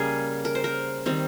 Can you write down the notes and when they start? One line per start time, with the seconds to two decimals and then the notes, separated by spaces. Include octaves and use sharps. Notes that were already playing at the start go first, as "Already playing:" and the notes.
Already playing: C#3 G3 A#3 G#4
0.45 A#4
0.55 C5
0.64 A#4
1.06 D#3 G3 C4